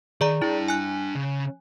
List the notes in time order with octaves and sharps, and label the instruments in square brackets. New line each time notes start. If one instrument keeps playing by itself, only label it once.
[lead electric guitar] D#3 [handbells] G#4 D5 A#5
[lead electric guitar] D4 G5 [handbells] E4
[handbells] G#5 F#6
[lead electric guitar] C#3